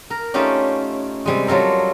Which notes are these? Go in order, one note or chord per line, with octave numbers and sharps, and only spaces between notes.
A#4
A3 C#4 D#4 F4 G4 D5
C3 G3 G#3
F#3 G3 F4 A4 A#4